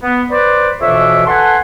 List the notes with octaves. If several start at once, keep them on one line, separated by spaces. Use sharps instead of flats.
B3
B4 C5 D5
F2 B2 E3 D4 C#5 E5
A4 B4 F#5 G#5 A5 C6